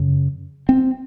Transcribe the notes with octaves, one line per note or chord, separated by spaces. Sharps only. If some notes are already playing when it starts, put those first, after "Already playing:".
Already playing: F#2 C#3
C4